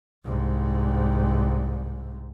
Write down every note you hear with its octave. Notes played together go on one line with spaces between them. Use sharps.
C2 G#2